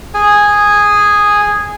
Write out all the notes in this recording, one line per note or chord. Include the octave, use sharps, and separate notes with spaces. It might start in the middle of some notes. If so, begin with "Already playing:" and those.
G#4 G#5